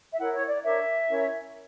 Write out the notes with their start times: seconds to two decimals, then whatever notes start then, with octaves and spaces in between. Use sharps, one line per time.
0.13 E5
0.17 E4 A#4 C#5 F#5
0.33 C#5
0.47 D5
0.63 D4 A#4 C#5 E5
1.08 C#4 E4 A#4 C#5